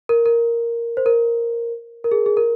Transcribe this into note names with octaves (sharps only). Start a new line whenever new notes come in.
A#4
A#4
C5
A#4
A#4
G#4
G#4
A#4